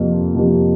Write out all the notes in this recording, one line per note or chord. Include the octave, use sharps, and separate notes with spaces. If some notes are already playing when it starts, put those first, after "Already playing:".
Already playing: F2 C3 F3 A#3
F2 C3 F3 A#3